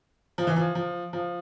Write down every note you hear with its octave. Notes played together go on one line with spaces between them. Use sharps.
F3
E3
F3
F3
F3